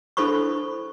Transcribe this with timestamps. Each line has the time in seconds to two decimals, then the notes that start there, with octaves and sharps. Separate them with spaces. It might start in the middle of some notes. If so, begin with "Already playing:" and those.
0.17 D4 E4 A4 C5 B5 C#6